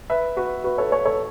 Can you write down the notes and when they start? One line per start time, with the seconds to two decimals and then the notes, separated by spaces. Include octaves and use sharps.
0.10 B4 E5
0.37 F#4 B4
0.64 F#4 B4
0.78 A4 C#5
0.92 A4 C#5
1.05 A4 C#5